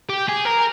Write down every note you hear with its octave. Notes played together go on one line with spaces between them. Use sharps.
G4
G#4
A#4